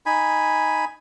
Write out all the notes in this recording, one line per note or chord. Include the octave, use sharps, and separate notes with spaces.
D#4 G#5 B5